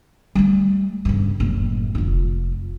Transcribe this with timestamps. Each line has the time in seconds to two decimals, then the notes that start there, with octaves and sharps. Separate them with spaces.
0.35 G3 A3
1.05 G2 C#3
1.40 F#1 A2
1.95 F1 F4